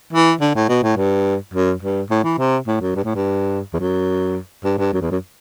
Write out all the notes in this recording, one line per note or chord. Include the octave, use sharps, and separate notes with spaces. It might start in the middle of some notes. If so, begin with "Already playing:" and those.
E3
D3
A2
B2
A2
G2
F#2
G2
A2
E3
C3
A2
F#2
G2
A2
G2
E2
F#2
G2
G2
F#2
E2
F#2